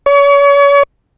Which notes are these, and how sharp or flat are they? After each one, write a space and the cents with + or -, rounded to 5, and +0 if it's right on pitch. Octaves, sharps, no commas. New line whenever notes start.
C#5 +35